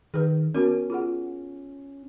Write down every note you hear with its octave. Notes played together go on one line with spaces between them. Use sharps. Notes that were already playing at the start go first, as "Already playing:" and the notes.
D#3 G#4 B4
B3 C#4 F#4 A#4
F4 G#4 F#5